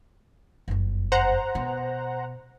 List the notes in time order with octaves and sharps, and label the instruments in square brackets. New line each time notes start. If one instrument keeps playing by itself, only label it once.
[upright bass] F#1 F2
[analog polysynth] C5 F#5 A#5
[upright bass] B2